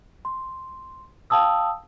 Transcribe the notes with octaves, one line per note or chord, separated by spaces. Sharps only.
C6
F5 G5 A5 D#6 E6